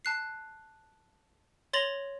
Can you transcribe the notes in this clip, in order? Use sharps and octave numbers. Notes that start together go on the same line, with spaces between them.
A5 F#6 C7
C#5 C6 A6 A#6 F7 F#7